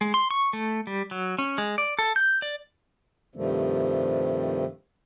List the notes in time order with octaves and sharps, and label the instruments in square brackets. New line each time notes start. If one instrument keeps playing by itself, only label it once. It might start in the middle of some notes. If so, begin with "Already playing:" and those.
[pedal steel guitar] G#3
C6
C#6
A3
G3
F#3
C#4
G#3
D5
A4
G6
D5
[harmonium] G2 C3 D#3 F3 G3 A3